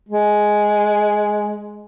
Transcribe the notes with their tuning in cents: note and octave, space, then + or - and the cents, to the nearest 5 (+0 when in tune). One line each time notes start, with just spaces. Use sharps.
G#3 +5